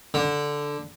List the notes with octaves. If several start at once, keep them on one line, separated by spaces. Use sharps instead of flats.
D3